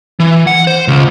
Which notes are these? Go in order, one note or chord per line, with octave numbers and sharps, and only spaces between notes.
E3
F#5
C5
C#2